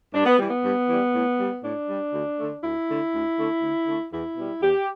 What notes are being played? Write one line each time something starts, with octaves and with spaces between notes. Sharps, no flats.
G2 D4
B3
E3 G3
B3
G2
E3 G3
A2
G3
A2 D4
G3
D2
D3 A3
D2 E4
D3 A3
D2
D3 A3
D2
D3 A3
E2 E4
B2 G3
E2 G4